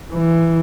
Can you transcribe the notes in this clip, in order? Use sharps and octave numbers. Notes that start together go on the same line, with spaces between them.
E3